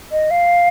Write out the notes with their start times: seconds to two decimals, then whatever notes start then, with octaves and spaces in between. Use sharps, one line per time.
0.12 D#5
0.31 F5